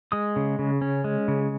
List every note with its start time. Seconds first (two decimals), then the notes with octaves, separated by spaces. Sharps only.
0.12 G#3 D#6
0.36 C#3
0.59 C#3
0.81 C#4
1.04 G#3
1.28 C#3